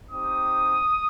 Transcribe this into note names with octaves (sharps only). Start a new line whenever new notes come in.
C4 D#4 G4 D#6